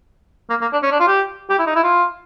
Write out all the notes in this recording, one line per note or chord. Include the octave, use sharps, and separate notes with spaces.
A#3
A#3
D4
C#4
D4
F4
G4
G4
E4
D#4
E4
F4